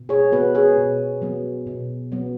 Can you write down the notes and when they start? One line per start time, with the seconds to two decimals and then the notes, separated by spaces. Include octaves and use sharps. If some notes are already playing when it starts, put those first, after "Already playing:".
Already playing: B2
0.09 G#4 C#5
0.32 B3 F#4 B4
0.55 G#4 C#5
0.77 B2
1.22 F#3 B3
1.67 B2
2.12 F#3 B3